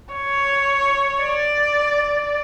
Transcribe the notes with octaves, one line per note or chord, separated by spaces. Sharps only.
C#5
D5